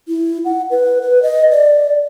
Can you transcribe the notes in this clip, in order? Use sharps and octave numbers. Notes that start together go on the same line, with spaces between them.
E4
F#5
B4
B4
D#5
D5